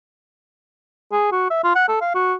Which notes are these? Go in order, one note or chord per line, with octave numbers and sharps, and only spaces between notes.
G#4
F#4
E5
F4
F#5
A4
F5
F#4